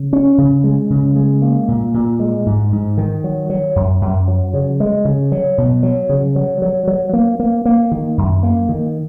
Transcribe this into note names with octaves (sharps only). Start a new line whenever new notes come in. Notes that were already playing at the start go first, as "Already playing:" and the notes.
Already playing: C#3
C#4
C#3
G#3
C#3
G#3
A#3
A#2
A#2
G#3
G#2
G#2
D#3
F#3
F#3
F#2
F#2
F#3
C#3
G#3
C#3
F#3
B2
F#3
C#3
F#3
F#3
F#3
A#3
A#3
A#3
D#3
F#2
A#3
D#3